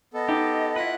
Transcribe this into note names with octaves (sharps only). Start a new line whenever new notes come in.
B3 A4 D#5
D#4 G4
E4 F4 B4 F#5 F#6